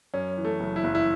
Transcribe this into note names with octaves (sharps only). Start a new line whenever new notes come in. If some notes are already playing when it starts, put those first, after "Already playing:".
F#2 C#4
E3
A3
F#1
E4
F#1
E4